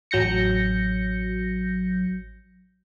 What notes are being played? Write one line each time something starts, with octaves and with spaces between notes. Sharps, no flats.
A1 F#3 G6 A#6 C#7